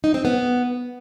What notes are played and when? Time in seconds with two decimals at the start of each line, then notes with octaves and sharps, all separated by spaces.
0.04 D#4
0.14 C4
0.25 B3